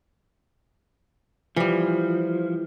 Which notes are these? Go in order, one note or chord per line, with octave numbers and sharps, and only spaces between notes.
E3 F3 G3